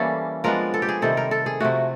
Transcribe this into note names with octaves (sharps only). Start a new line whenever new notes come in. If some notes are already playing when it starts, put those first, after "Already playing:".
Already playing: E3 G3 A#3 C#4 A4
F3 G#3 B3 D4 A#4
A4
G4
G#4
C3 D#3 G3 C4 A4
A#4
A4
G#4
C3 F3 A3 F#4